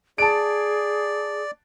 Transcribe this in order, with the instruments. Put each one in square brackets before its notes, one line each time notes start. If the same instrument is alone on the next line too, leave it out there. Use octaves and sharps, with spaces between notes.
[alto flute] G#4 [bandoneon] D5 [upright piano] A5 D7